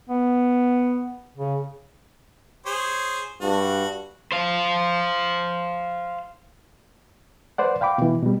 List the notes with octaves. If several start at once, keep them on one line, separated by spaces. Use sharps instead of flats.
B3
C#3
G#4 C5 C#5
G2 F#4
C5 F5
B4 C5 D5 F#5
F5 G5 B5 D6
B2 E3
B2 G3